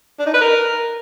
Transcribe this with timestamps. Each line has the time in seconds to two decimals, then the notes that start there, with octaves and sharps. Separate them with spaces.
0.19 D4
0.26 D#4
0.34 B4
0.41 A#4